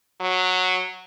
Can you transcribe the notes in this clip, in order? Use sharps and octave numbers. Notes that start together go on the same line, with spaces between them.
F#3